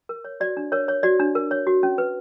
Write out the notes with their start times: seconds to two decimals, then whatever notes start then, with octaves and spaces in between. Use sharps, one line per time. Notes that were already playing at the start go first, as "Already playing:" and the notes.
0.09 A#4
0.25 C#5
0.40 F#4 D5
0.57 D4
0.72 A#4 C#5
0.88 C#5
1.03 F#4 D5
1.20 D4
1.35 A#4
1.51 C#5
1.67 F#4
1.83 C#4
1.98 B4